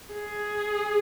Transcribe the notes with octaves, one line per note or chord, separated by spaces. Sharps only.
G#4